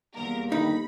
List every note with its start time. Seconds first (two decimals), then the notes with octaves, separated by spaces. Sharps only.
0.15 E2 G3 A#3 A#4
0.52 G1 G2 D#3 D#4 B5